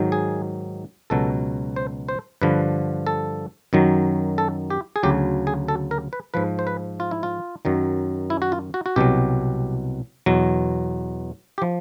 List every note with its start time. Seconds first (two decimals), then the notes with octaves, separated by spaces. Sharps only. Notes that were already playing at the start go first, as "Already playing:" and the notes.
Already playing: G#2 D#3 F#3
0.12 G#4
1.10 C#2 B2 F#3 A4
1.76 C5
2.09 C5
2.42 G2 D3 F3 B4
3.07 A4
3.73 F#2 D#3 F#3
4.38 A4
4.70 G4
4.96 G#4
5.03 D2 C#3 F#3 G4
5.47 G#4
5.68 A4
5.91 A#4
6.13 B4
6.34 G#2 F3 B4
6.59 C5
6.67 B4
7.00 F4
7.11 E4
7.23 F4
7.65 F#2 D#3 F#3
8.30 E4
8.42 F#4
8.52 F4
8.74 F#4
8.86 F#4
8.96 C2 B2 F#3 G4
10.26 E2 B2 F#3
11.58 G4
11.62 F3